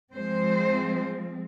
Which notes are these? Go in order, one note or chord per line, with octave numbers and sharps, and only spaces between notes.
F3 G#3 C4 C5